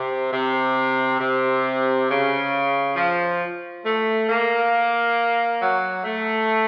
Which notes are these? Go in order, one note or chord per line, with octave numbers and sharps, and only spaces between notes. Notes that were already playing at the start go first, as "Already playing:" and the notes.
Already playing: C3
C3
C3
C#3
F3
A3
A#3
F#3
A3